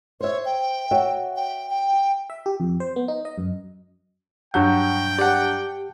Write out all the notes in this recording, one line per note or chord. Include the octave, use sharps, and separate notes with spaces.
C5 C#5 E5
G5
F#4 C#5 E5
G5
G5
E5
G4
F2
C5
B3
D#4
D#5
F#2
G2 F#3 F#5 G5 A5 C#6 G6
G4 D5 F#5 A5